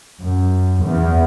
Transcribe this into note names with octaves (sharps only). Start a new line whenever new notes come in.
F#2
E2